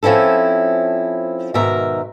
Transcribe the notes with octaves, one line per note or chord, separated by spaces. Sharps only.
F3 C4 C#4 E4 A4
G#2 B2 D#3 A#4 E5 A#5